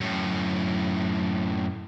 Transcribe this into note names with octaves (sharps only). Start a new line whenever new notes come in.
F#2 A2